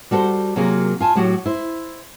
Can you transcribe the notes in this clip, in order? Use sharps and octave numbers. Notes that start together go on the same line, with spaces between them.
G3 F#4 A4 B4 C5
C3 F#3 A#3 F4 G#4 A#4
F4 G#5 A5
A2 F#3 F#4 G4
E4 C5